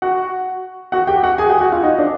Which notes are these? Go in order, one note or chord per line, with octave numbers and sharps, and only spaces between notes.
F#4 F#5
F#4 F#5
G4 G5
F#4 F#5
G#4 G#5
G4 G5
F#4 F#5
F4 F5
D#4 D#5
D4 D5